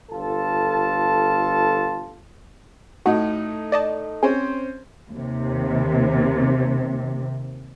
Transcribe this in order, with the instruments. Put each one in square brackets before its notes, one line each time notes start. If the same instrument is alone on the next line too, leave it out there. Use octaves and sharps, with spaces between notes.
[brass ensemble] G1 F4 A4 A5
[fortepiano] A2 A3 D#4 [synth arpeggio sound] F#4
[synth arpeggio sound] D5 D#5 A5
[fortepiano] C4 C#4 C5 [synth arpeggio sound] G#4
[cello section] D#2 C3